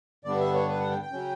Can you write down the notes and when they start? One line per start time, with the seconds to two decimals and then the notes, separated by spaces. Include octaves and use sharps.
0.24 G2 D3 G3 B3 D4 D5
0.40 E5
0.54 C#5
0.68 B4
0.80 F#5
0.90 G5
1.02 G5
1.12 C#3 F#3 C#4